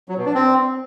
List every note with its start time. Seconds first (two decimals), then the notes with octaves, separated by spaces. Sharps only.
0.09 F#3
0.17 B2
0.26 D4
0.35 C4